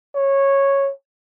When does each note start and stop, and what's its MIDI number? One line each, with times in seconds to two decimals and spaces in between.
0.15 0.92 73